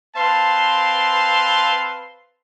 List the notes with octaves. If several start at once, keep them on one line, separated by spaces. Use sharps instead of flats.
C4 B4 F5 A5 C6